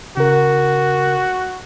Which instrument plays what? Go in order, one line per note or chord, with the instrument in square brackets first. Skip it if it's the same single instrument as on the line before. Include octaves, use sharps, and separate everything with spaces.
[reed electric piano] C#3 A#4 [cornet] F#4